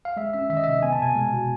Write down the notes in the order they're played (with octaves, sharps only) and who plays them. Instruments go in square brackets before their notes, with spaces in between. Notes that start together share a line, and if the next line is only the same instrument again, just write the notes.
[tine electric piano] F5
G#3 E5
C#4 E5
D#3 E5
D#5
C3 E5
B3 G#5
A5
B2 G#5
G#3
B2